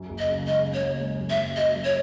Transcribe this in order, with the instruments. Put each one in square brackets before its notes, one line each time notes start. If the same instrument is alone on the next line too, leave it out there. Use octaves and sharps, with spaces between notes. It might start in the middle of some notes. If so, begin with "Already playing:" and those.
Already playing: [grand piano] F#2
F#1
[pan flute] D#5
[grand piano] C#3
[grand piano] G#3 [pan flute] D#5
[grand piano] C#3
[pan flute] C#5
[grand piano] F#1
G#3
F#2
[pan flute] E5
[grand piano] F#2
[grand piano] F#2 [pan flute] D#5
[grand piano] F#2
[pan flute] C#5